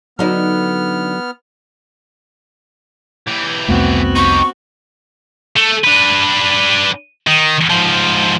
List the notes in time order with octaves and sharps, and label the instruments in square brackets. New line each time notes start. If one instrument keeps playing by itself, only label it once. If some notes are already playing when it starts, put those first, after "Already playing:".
[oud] D3 D#4 E4 [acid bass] F#3 [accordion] B3 F6
[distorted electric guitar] E3 G4
[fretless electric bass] C2 F2 A3 [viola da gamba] B3 C4 F#4
[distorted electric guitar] D#4 G4 [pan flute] C#6
[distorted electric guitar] A3
D4 B4
D#3
G#2 F3